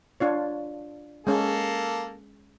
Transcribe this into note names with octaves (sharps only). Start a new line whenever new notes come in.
D4 F4 C#5
G#3 A#3 C#4 A4